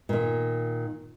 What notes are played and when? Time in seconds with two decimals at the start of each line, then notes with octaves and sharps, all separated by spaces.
0.09 A#2 D#3